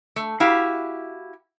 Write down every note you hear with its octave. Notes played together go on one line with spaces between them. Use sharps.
A3
E4 F#4 G4 F5